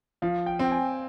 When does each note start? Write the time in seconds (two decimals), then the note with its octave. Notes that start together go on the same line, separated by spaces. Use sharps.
0.22 F3 F5
0.46 G5
0.59 C4
0.65 G5
0.72 G#5